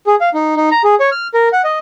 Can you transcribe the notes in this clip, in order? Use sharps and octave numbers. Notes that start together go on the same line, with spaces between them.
G#4
F5
D#4
D#4
A#5
G#4
C#5
F6
A#4
F#5
D#5